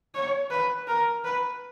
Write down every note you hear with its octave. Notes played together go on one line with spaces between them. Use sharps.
C#5
B4
A#4
B4